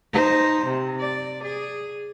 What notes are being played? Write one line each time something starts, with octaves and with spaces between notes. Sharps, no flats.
D#4 C5
C3
D5
G#4